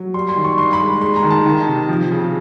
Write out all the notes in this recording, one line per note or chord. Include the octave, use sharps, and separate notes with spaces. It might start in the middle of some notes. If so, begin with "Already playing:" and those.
Already playing: F#3
G3 C6
C6
D#3
C#6
G2 C6
B5
G#3
G#3 C6
A#5
D#3
A5
D#3
C3
F3
C#3